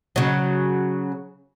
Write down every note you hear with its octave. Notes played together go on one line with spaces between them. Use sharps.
C#3 F#3